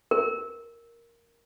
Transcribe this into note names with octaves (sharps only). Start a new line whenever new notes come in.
A#4